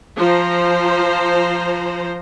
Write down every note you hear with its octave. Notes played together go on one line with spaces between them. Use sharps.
F3 C5 A#5